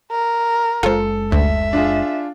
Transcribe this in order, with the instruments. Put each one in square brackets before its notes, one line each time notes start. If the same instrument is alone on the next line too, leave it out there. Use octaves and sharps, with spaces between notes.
[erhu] A#4
[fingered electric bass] F#1 G#3 [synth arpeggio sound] F4 C5 [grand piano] A4
[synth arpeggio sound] D2 [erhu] E5
[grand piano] D4 F4 G#4